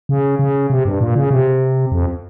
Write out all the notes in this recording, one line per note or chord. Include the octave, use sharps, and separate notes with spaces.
C#3
C#3
C3
G2
A#2
C#3
C3
F2